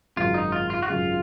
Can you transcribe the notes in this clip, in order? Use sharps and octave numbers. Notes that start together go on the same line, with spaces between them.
G#1 F#2 C#3 F4
D#4
F4
F4
F#4
G#1 F#2 C#3 F4